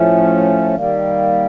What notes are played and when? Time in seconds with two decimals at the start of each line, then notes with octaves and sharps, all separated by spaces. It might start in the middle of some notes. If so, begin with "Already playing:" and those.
Already playing: A2 F3 A3 C#4
0.76 D#3 G3 A#3